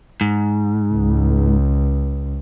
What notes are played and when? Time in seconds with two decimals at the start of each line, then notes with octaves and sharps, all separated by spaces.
0.21 G#2
0.94 C#2